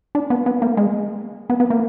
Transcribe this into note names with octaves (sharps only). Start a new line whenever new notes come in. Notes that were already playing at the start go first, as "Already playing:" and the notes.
D4
B3
B3
A#3
G#3
B3
B3
A#3